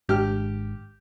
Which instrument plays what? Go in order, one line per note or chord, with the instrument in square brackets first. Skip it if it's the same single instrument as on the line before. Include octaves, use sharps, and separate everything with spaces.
[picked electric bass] G#1 G#3 D4 [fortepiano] G4 F6